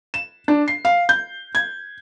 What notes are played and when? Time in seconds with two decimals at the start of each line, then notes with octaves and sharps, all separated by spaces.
0.14 E7
0.48 D4
0.68 C7
0.85 F5
1.09 G6
1.55 G#6